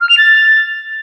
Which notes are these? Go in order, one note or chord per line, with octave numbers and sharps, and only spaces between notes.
F6
F7
A6